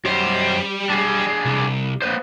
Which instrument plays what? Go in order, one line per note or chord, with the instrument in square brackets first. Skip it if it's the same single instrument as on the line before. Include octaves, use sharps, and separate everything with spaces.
[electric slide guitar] F#2 C5 [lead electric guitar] G3 G4
[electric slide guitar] D4 G#4
[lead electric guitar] C2
[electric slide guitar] A#3 B4 C5